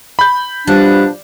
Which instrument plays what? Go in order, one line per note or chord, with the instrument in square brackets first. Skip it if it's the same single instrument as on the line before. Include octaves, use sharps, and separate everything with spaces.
[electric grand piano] B5 G6
[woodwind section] B2 F3 D4 [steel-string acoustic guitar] G3